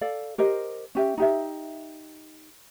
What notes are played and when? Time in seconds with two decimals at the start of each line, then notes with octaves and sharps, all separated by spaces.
0.01 A4 D5 F5
0.38 G4 A#4 C5 D#5
0.95 C#4 G4 E5
1.17 D#4 G4 E5